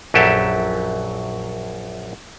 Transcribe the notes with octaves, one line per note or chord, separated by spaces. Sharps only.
A#1 F#2 F#3 G4 A4 E5